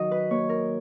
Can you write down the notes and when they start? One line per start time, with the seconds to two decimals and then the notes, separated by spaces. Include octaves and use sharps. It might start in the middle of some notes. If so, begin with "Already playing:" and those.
Already playing: D#3 F#3 D#5
0.11 B4
0.31 A#3 C#5
0.49 A#4